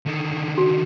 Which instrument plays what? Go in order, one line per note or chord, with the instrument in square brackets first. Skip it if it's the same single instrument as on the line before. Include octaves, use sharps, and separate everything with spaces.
[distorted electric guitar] D3 D#3
[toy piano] F#4